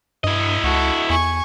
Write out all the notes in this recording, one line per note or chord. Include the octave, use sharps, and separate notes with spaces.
G2 E4 D#5
C#2 F#4 A4
E2 G#5 C#6